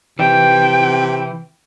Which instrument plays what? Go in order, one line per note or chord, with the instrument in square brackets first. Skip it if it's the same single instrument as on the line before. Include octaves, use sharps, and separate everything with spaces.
[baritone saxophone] C3 [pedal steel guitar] E3 [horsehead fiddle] G5